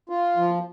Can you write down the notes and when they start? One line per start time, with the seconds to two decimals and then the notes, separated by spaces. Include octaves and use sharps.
0.09 F4
0.37 F3